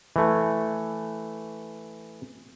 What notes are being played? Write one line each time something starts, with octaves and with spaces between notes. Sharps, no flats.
E3 A3